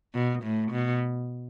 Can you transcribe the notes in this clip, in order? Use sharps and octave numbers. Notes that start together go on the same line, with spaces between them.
B2
A2
B2